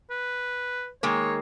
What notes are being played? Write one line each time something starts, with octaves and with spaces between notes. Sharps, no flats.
B4
D#3 G#3 A#3 C#5